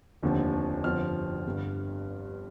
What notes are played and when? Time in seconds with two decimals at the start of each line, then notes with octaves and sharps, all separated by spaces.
0.23 F1 D#2 D3 F3
0.84 G1 F2 D3 F3 F6
1.45 G1 G2 D3